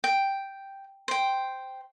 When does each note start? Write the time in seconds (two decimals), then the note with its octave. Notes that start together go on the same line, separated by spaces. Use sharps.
0.04 G5
1.08 C5 G5